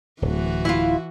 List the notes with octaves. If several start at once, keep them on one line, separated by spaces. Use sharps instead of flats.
D1 D2 E3 F#4
E4 F4